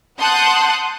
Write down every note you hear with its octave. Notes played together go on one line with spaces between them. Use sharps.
F#5 A5 C6 D#6 F#6 G6